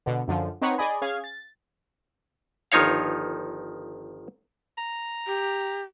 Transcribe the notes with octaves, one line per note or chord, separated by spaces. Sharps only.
B2 D3
F#2 D3 F3
C4 D#4 B4 C#5 F#5
G#4 D5 D#5 G#5 B5
C#4 G#4 F5 G#6
A6
G1 D#3 F3 D#4 C#5 F5
A#5
G4